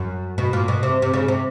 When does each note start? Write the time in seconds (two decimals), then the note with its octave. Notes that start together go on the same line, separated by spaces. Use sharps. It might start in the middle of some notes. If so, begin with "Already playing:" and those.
Already playing: F#2
0.38 B2
0.53 A#2
0.68 B2
0.83 C3
1.02 C3
1.14 C#3
1.28 C3